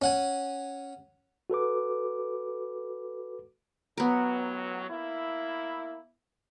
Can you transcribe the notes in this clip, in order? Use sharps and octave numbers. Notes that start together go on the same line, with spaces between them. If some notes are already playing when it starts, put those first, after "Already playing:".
C#4 F#5 G#5
F#4 A4 B4 D6
A1 F#3 B3 A#4
A#3 E4